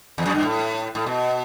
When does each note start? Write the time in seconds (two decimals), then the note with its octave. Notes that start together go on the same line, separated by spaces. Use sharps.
0.18 E2
0.26 F#2
0.35 G2
0.43 A2
0.95 A2
1.06 B2